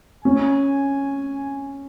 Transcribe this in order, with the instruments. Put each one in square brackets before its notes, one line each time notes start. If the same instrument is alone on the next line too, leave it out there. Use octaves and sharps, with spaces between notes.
[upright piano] C#4 [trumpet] G#5